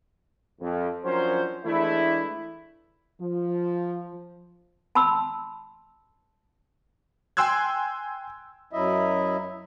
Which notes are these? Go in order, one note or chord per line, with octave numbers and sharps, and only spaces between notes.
F2
F3 F#3 C#4 D4 A#4 C5
E3 G#3 A3 D4 E4
F3
A5 B5 C6 E6
G5 G#5 C6 E6 F#6 G#6
F#2 F#3 E4 D#5 E5